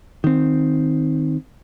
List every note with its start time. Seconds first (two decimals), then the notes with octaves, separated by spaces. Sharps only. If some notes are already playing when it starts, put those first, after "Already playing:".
0.24 D#3 C4